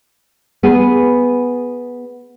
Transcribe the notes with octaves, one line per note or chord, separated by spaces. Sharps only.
B3 G#4